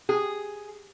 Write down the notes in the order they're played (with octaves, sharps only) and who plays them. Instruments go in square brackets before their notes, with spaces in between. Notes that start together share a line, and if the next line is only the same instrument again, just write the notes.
[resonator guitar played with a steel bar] G#4